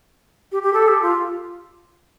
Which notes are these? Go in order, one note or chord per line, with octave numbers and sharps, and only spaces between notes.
G4
G4
A4
G4
F4